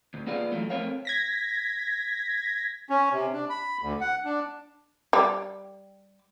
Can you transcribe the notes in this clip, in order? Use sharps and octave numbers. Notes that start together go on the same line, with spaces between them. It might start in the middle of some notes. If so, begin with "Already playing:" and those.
D2
A#3 B3 F4 G#4 D5 F5
E3 F#3 A3 F4
F2 A3 C4 A#4 C#5 F5
G#6 A#6 B6
C#4
C3
D4
B5
D2
F#5
D4
G3